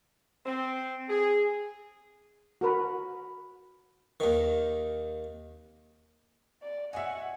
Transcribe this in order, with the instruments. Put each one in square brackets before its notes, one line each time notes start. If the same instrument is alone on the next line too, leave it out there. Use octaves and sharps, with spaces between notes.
[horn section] C4
G#4
[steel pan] F#4 A#4 B4
[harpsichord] D#2 D#3
[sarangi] D5
[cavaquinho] F#4 C#5 G#5 [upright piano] D#5 E5 [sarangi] F#5